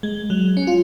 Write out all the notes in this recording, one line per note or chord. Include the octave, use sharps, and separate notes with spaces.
G#3
F#3
C#4
F4